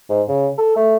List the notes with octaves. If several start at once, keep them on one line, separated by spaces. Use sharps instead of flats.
G#2
C#3
A4
A3